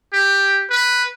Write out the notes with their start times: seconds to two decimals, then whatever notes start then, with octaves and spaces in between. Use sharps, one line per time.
0.13 G4
0.70 B4